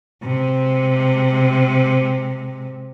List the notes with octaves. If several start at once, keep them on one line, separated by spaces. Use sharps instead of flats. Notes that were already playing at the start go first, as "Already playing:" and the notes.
C3 G#3